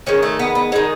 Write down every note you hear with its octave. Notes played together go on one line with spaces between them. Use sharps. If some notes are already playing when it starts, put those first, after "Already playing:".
D#3 G#3 C#4
A3
B3
B3
D#3 G#3 D#4